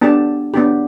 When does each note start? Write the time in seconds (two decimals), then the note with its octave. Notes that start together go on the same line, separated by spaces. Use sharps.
0.01 B3 D4 G4 A5
0.54 B3 D4 G4